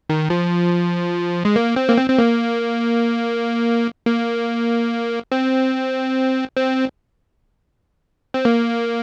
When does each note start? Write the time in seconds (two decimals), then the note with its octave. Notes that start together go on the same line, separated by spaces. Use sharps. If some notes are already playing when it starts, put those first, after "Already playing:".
0.10 D#3
0.30 F3
1.45 G#3
1.56 A#3
1.76 C4
1.89 A#3
1.97 C4
2.10 C4
2.19 A#3
4.06 A#3
5.32 C4
6.57 C4
8.34 C4
8.45 A#3